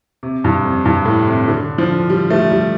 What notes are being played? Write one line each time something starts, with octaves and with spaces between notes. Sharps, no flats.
C3
G2
F2
G2
A2
C3
D3
F3
G3
A3
G3